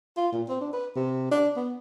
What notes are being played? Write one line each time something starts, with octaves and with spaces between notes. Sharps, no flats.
F4
A#2
C4
D4
B4
C3
D4
B3